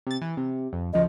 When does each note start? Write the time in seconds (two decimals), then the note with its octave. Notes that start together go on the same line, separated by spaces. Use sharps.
0.07 C3 A6
0.22 E3
0.37 C3
0.73 F2
0.93 D2 C#3 F3 D#5